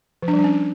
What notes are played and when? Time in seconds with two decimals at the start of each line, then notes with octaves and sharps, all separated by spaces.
0.22 F3
0.28 D4
0.33 G3
0.39 D4
0.44 C#4